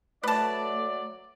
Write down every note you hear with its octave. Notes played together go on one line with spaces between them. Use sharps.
F#3 A3 B4 D5 A5